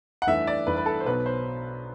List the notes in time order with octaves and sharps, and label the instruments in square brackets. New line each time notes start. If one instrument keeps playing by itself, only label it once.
[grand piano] F#5
G2 E3 A3 E5
D5
G2 E3 A3 B4
B4
A4
C5
B1 B2 F#3 B3 B4
C5